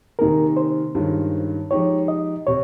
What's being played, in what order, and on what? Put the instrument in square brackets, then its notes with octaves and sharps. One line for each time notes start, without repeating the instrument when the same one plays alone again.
[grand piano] C3 D#3 A#3 D#4 G#4 [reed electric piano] A#4
[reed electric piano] C5
[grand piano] G2 D#3 G#3 C#4 F4
[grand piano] F3 G#3 D#4 G4 [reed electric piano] C#5
[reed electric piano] D#5
[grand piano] C3 [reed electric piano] C#5